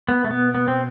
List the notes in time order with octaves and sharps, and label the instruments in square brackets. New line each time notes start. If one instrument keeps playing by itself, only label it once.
[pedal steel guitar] B3
[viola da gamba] B2 [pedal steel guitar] A3
[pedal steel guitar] B3
B3
C4